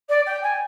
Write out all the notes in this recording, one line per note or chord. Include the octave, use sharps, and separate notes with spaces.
D5
G5
G#5